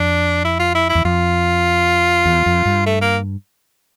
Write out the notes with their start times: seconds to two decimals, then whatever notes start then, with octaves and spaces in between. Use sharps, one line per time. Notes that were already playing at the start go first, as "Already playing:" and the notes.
Already playing: F2 D4
0.45 E4
0.59 F4
0.75 E4
0.89 E4
0.95 E2
1.05 F2 F4
2.26 E2
2.46 F2
2.66 G2
2.86 A3
3.01 A#3